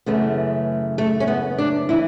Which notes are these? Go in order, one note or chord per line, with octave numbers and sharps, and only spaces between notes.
F#2 C#3 E3 A3 B3
A3
C#4
B3
D4
E3 E4